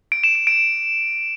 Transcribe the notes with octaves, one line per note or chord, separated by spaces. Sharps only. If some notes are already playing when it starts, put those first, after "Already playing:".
D7
E7
D7
D7